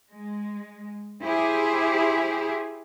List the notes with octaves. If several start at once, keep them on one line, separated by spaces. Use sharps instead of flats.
G#3
E4 G4 G#4 C5